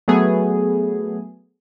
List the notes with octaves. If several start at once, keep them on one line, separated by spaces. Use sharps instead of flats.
F#3 A3 B3 G#4